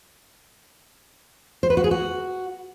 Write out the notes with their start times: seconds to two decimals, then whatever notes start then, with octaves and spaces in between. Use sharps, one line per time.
1.63 C5
1.70 B4
1.77 F#4
1.84 G#4
1.91 F#4